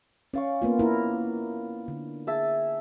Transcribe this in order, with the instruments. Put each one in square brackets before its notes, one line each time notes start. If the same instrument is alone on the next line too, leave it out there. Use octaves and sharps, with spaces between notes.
[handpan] C#4 [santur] D5 F5 C#6
[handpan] A#3 B3 F4
A#3 E4 A#4
D3
[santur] G#4 E5 A5